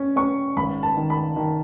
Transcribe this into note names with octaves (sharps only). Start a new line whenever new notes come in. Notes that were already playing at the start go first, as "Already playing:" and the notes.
Already playing: C#4
C#4 C#6
G#1 B5
A5
D#3
B5
D#3